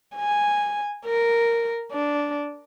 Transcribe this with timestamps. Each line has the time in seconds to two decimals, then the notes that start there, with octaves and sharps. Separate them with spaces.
0.16 G#5
1.06 A#4
1.92 D4